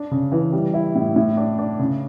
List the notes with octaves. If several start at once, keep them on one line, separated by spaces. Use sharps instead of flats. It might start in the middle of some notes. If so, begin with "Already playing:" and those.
Already playing: D4
C#3
E3
G3
E4
A2
A2
D4
D4
C#3